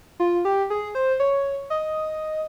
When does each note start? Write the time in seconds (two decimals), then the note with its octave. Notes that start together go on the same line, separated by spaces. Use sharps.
0.20 F4
0.45 G4
0.70 G#4
0.95 C5
1.20 C#5
1.70 D#5